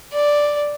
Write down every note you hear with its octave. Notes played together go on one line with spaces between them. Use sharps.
D5